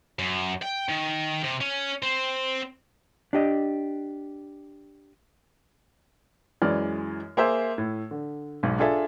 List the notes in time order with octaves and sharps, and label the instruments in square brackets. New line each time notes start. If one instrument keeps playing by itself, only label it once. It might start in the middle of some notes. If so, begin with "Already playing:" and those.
[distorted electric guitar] F#2
G5
D#3
C3
C#4
C4
[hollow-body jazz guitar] D4 G4 D#5
[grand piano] F#2 E3 G#3 D5 F6
A#3 G#4 C5 E5 E6
A2
D3
B1 G#2
D4 F4 G#4 A4 E5